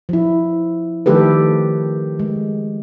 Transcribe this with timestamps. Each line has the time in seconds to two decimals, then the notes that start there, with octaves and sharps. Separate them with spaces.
0.09 F3 E4
1.06 D#3 F3 A3 G4 A4 B4
2.19 G#3